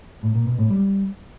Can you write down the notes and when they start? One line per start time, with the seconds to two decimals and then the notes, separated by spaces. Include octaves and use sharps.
0.23 A2
0.35 A#2
0.47 B2
0.58 A2
0.70 G3